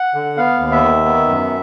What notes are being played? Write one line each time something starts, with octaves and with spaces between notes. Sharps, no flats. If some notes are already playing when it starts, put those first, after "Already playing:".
Already playing: F#5
D3
B3 F5
D#2
E5
D#3
B3
F#2